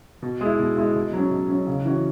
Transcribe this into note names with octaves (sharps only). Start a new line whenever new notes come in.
B2
G#3 E4
B2
G#3 E4
B2
F#3 C#4
B2
F#3 C#4
C#3
E3 C#4 F#4